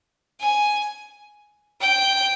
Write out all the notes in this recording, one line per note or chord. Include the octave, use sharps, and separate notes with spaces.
G#5
G5